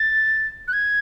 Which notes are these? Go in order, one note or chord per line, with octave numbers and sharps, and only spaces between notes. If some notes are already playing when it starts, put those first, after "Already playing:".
Already playing: A6
F#6
G#6